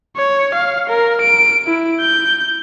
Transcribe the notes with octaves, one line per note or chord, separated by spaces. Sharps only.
C#5
F5
A#4
D7
E4
G6